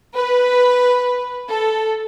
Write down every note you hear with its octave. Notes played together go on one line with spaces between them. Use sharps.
B4
A4